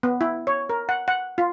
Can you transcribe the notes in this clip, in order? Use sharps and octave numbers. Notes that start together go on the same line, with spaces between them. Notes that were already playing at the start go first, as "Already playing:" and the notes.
B3
E4
C#5
A#4
F#5
F#5
F4